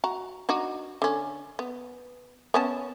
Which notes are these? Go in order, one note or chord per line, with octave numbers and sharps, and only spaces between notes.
F#4 A#5
D4 D#4 F#4
D3 C#4
B3
B3 C#4 A5